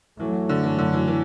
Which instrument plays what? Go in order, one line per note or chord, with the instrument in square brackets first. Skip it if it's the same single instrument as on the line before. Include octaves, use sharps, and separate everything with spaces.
[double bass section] F#2 F#3 A3 [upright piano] E3
[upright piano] D3
E3
D3
E3
E3